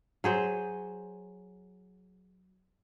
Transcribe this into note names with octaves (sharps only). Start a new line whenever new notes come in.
F#3 G#4 C5